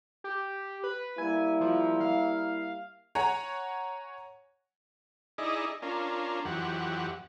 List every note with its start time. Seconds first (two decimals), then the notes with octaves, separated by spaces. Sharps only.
0.24 G4
0.84 B4
1.18 G3 A#3 E4 G#5
1.61 F3
2.01 F5
3.15 C#5 F#5 G#5 A#5
5.38 D#4 E4 G#4 D5 D#5
5.82 C#4 D4 F4 A#4
6.45 F2 E3 F#3 G4 F#5